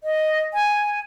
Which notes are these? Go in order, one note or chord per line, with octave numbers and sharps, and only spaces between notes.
D#5
G#5